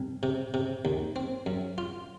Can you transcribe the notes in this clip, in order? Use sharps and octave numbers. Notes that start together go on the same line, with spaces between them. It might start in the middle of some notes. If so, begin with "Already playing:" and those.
Already playing: C2
C3
C3
D#2
C4
F#2
F4